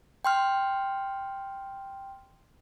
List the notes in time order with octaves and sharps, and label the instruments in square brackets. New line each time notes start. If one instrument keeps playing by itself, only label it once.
[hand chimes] G5 C6 F6